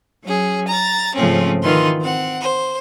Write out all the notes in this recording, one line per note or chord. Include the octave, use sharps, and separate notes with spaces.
F#3 C#4 G#4
A#5 A6
G#2 C#3 F3 A3 C4 C#4
D#3 E3 F4 B4 C6
C4 F#5
C5